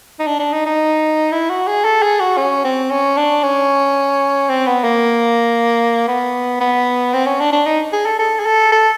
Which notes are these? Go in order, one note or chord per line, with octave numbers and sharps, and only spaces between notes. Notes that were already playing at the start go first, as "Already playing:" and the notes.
D#4
D4
D4
D#4
D#4
E4
F#4
G#4
A4
G#4
F#4
C#4
C4
C#4
D4
C#4
C4
B3
A#3
B3
B3
C4
C#4
D4
D4
D#4
G#4
A4
A4
G#4
A4
A4